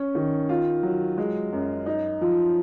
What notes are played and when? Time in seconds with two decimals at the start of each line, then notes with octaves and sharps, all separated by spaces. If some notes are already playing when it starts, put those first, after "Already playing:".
Already playing: C#4
0.15 D#3
0.49 F4
0.83 F#3
1.18 G#3
1.53 F#2
1.86 D#4
2.21 F3